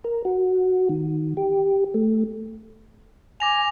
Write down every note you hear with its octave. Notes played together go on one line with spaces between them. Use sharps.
A#4
F#4
D#3
G4
A3
G#5 D6 A#6 F7